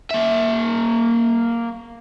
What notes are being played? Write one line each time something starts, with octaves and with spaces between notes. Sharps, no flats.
A#3 E5